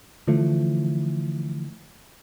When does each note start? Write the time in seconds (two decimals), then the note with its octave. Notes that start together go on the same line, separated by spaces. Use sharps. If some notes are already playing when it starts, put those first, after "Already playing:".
0.27 D3 E3 F3 A3